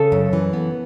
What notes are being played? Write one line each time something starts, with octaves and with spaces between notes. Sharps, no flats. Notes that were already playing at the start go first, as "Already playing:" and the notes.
Already playing: C#3 A4
F#2
E3
B3